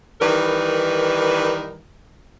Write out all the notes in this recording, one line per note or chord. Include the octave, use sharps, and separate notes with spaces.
D#3 E3 G3 D#4 A#4 B4